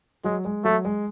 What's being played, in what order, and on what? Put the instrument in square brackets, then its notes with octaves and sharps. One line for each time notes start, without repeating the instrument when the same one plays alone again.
[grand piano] F#3 [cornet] G#3
[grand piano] G#3
[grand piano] F#3 [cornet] A3
[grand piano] G#3